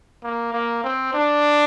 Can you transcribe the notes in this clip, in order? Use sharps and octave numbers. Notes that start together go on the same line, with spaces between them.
A#3
A#3
C4
D4